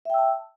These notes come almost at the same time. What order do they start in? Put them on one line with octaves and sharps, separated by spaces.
E5 G5 E6 A5